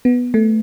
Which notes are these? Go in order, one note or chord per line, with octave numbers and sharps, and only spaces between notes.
B3
A3